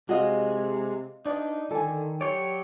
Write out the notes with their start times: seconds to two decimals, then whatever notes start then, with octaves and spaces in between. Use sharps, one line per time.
0.09 C3 G#3 F#4 D#5 F5
1.26 D4 D#4
1.71 D3 D#3 A4 G#5
2.21 F#3 G4 C#5 D5